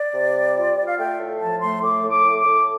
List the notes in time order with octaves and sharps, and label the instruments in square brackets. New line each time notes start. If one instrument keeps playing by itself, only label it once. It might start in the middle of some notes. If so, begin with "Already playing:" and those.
Already playing: [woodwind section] D5
C3
G3
F4
F4
F5
A3 G5
A2
F3 A5
A3 C6
A2 D6
A2
D6
A2
D6
A2